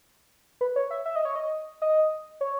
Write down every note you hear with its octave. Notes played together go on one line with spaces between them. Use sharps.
B4
C#5
E5
E5
D#5
C#5
D#5
D#5
C#5